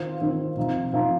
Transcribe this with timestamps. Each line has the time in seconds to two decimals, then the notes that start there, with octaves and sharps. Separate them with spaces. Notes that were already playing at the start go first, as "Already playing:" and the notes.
Already playing: D#3 C4 F4
0.22 D#3 C4 F4
0.57 C3 F3 D#4
0.93 C3 F3 D#4